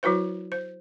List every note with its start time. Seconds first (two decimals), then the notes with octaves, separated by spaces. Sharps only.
0.03 F#3 E4 F#4 B4 C5
0.52 C5